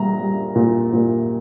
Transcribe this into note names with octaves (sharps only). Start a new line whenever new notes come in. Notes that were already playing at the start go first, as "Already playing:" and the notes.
Already playing: A#2 G3 A#5
G3
A#2
A#2